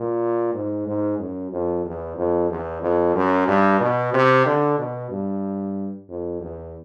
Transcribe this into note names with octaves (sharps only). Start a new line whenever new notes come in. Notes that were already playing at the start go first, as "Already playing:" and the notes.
Already playing: A#2
G#2
G#2
F#2
F2
E2
F2
E2
F2
F#2
G2
B2
C3
D3
B2
G2
F2
E2